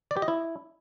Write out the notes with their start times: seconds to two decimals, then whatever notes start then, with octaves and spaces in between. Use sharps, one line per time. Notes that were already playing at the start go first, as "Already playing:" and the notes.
0.11 D5
0.17 G4
0.22 D#5
0.28 E4